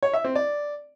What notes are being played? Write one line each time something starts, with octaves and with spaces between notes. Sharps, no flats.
C#5
E5
C4
D5